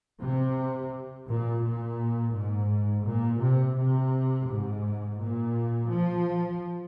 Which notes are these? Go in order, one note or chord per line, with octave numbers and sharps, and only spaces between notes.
C3
A#2
A#2
G#2
A#2
C3
C3
G#2
A#2
F3